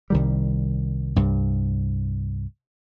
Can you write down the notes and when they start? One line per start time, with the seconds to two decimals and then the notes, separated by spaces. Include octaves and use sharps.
0.10 C2 D#3 G3
1.16 C2 G2